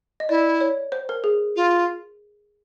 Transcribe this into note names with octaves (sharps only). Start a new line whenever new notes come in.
D#5
E4 D5
C#5
C5
A#4
G#4
F4